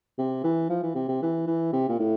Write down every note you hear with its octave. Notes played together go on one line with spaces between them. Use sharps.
C3
E3
F3
E3
C3
C3
E3
E3
C3
A#2
A2